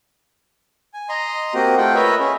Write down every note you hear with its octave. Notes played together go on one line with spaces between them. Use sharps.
G#5
D#5 A#5 C6
A#3 C4 F#4 G4 D#5
A3 F4 F#5 G5
A#4 B4 C#5 D#5 E5 B5
C#4 G#4